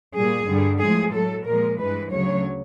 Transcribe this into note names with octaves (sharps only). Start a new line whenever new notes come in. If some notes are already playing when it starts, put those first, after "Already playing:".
A#2 G3 G#4
G2 D3 G3
A2 F3 G#3 G#4
A2 F#3 A4
A#2 F3 G#3 A#4
G2 E3 G#3 B4
D2 C#3 F#3 C#5